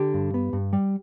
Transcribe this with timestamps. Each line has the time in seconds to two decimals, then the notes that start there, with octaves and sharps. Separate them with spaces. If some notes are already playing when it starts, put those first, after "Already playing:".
Already playing: D3 G4
0.14 G2
0.34 B3
0.53 G2
0.73 G3